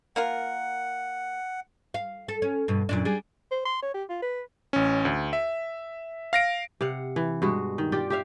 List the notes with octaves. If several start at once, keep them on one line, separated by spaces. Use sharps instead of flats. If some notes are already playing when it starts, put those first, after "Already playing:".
A#3 F4 A#4 F#5
F5
A4
C#4
G2 B2
F#2 A#2 D4
G3 D4 G#4
C5
C6
C#5
G4
F4
B4
A1 C#4
D2
E5
F5 A#6 D7
C3 F5 F#5
E3
G2 B2 G#3 F#4
D#3
F4 G4 D5 G5
G4 E5 F5